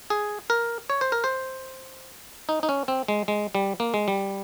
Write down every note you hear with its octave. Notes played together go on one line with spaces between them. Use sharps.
G#4
A#4
C#5
C5
A#4
C5
D#4
D#4
C#4
C4
G#3
G#3
G3
A#3
G#3
G3